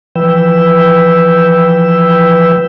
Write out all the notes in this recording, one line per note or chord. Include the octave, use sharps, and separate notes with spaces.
E3 F3 B4 G5 E6